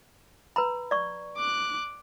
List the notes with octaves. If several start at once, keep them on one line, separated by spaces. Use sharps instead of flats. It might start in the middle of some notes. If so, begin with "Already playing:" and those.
B4 A#5 B5
D5 C#6
D6 F#6